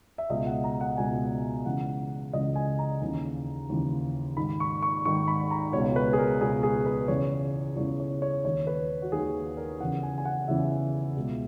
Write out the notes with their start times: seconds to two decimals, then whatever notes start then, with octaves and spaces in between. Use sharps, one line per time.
0.18 E5
0.30 C#2 B2 D#5
0.46 F#5
0.64 A#5
0.81 F#5
0.98 C#2 B2 G#5
1.65 C#2 C#3 E3 F#5
2.33 C#2 C#3 E3 D#5
2.56 G#5
2.79 A#5
3.01 D#2 C#3 E3
3.69 D#2 C#3 E3
4.37 G#2 D#3 B5
4.60 C#6
4.82 C#6
5.05 G#2 D#3 C#6
5.28 B5
5.51 A#5
5.73 C#2 B2 C#5
5.96 B4
6.13 G#4
6.19 A#4
6.41 C#2 B2 G#4
6.63 G#4
6.86 B4
7.08 E2 C#3 E3 C#5
7.76 E2 C#3 E3 C#5
8.00 C#5
8.22 C#5
8.44 D#2 D#3 C#5
8.67 B4
9.02 F#4
9.12 D#2 D#3 G#4
9.57 A#4
9.80 E2 C#3 E3 F#5
10.03 G#5
10.18 G#5
10.25 F#5
10.48 E2 C#3 E3 E5
11.16 C#2 B2